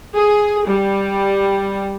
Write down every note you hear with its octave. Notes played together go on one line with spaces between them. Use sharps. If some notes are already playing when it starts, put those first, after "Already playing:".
G#4
G3